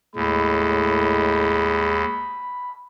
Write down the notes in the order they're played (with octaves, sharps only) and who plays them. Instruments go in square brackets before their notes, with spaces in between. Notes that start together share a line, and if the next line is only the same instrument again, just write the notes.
[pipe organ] D#2 [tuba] A2 [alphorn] G#3 [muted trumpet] B5